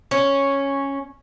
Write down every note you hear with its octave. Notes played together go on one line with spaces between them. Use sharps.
C#4